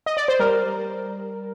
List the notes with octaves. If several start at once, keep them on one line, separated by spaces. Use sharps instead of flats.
D#5
D5
C5
G3 A#4